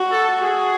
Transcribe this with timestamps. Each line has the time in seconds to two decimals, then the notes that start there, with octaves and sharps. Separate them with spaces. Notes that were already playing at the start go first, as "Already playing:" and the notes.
Already playing: F#4
0.11 A4
0.42 F#4 G#4